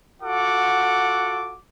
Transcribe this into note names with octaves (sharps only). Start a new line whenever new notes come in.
F4 F#4 A4 F#5 D6